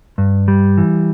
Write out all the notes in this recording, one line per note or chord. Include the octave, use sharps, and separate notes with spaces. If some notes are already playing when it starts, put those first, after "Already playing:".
G2
G3
E3